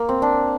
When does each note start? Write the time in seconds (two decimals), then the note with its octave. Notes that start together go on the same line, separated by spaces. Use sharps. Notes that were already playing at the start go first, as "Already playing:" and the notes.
Already playing: A#3
0.09 C4
0.22 D4